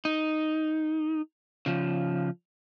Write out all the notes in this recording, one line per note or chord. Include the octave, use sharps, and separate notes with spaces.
D#4
C#3 F3